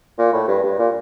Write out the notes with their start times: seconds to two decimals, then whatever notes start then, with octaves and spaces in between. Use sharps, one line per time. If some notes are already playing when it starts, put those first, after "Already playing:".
0.18 A#2
0.33 A2
0.48 G2
0.63 G2
0.79 A#2